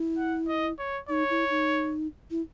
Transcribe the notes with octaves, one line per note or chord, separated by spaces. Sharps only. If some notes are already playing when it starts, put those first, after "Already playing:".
Already playing: E4
F#5
D#5
C#5
D#4 C#5
E4
D#4
E4